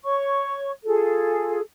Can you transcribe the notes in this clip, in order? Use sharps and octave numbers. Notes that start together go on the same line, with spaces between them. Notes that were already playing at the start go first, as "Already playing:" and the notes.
C#5 C#6
F4 G#4 A4